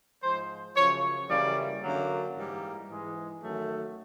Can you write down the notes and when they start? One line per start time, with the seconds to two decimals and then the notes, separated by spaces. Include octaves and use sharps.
0.23 G#2 F3 G#3 C5
0.76 F#2 C#3 F3 C#5
1.29 F#2 C#3 E3 G3 A#3 D5
1.82 F#2 D3 F#3 A#3
2.35 G#2 E3 G3 A#3
2.89 G#2 E3 G#3
3.42 F#2 D#3 F#3 A3